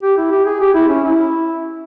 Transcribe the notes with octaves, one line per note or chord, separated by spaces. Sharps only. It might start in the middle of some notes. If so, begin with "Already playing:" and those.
G4
E4
G4
G#4
G4
E4
C#4
E4